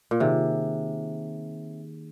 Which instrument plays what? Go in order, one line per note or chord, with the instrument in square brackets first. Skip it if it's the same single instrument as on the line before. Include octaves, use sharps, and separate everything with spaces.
[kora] A#2
[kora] C3 [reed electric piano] D#3 A#3 D#4 G#4